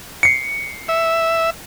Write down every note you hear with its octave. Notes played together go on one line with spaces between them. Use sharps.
C7 C#7
E5